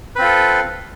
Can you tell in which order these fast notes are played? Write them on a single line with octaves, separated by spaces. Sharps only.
B4 C4 F4 A4